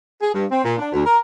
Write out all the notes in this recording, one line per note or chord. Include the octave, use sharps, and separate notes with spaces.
G#4
G2
C4
A#2
D4
D2
A#4